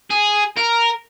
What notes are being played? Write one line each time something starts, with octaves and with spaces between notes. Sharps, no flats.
G#4
A#4